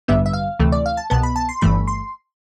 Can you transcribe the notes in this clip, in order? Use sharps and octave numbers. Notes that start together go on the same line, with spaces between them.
A1 G2 D3 G3 B3 E5
E5
F5
D2 C3 E3 A3
D5
F5
A5
C2 B2 B3 A5
B5
A5
C6
G1 G2 E3 A3 B5
C6